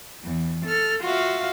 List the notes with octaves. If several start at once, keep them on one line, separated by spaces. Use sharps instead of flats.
E2
A4 F6
F4 F#4 E5 F5